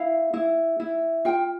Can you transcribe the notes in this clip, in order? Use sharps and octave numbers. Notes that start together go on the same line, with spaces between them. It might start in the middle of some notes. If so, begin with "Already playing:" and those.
Already playing: E4 F5
E4
E4
F4 G5